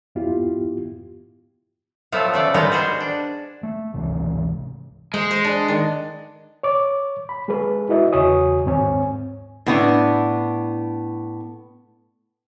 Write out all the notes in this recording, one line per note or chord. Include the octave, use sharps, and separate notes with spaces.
F2 G#2 B3 E4 F4 G4
F3 F#3 A3 B3
C#3 A3 D5
G3 G#3 B3 D#4 A#4
F#4 G#4 C5
D4
A3
G#1 C#2 C3 E3
G#3 C5
C5
D4 B4
D#3 D4
C#5 D6
B5
G#3 G#4 A4 B4
E4 F#4 B4 D#5 E5
E2 C#3 F#4 C#5 G#5 D#6
D#2 G#2 C4 C#5 G#5
A2 B3 D4